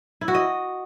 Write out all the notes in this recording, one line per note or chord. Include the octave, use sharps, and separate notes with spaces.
E4
F#4
D#5